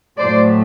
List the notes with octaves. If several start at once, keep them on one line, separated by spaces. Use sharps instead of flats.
A2 F#3 A3 C5 D5